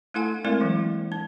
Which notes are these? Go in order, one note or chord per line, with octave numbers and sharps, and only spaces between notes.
A3 D4 E4 A4 F#5 G#5
G#3 A3 C4 E4 A#4 D5
E3 F#3 A#3
D4